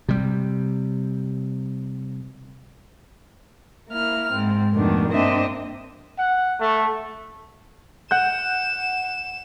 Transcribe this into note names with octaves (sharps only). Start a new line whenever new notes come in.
C3 G3
A#3 E4 F6
G#2 C4
F2 B2 D#3 A3 D4
G2 A#3 C4 D4 D#5 E5
F#5
A3
F#5 F#6 G6 E7